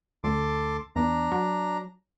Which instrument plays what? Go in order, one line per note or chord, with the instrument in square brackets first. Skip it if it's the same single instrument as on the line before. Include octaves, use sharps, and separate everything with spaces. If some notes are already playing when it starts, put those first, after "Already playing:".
[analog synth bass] D2 [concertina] A4 C6 D6
[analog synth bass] E2 [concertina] D4 A#5
[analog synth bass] F#3